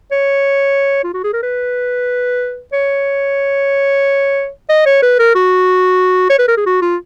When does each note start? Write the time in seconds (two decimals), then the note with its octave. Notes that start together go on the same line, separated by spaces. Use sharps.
0.12 C#5
1.04 F4
1.14 F#4
1.24 G#4
1.33 A#4
1.43 B4
2.73 C#5
4.69 D#5
4.86 C#5
5.03 B4
5.19 A#4
5.35 F#4
6.30 C#5
6.39 B4
6.48 A#4
6.57 G#4
6.66 F#4
6.82 F4